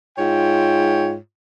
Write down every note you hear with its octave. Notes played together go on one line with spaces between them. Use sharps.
G#2 F4 C#5 G5